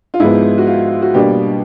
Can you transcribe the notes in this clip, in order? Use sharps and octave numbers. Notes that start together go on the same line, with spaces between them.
F4
G#2 F3 G#3 B3 E4
F#4
F4
F#4
B2 G3 A#3 D4 G4